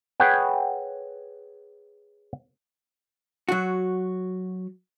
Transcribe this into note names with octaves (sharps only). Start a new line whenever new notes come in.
G#4 B4 C#5 F#5 G5
F#3 F#4